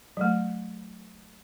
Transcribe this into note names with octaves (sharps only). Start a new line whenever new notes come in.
F#3 A3